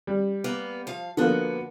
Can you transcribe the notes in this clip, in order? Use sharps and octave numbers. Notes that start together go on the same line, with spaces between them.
G3
A#3 B3
F3 F5
D3 F3 A#3 B3 F#4